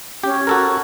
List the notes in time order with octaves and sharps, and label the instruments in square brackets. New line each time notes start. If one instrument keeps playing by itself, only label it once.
[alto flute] C#4 [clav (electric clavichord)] G4
[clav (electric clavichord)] F#4 A4 A#4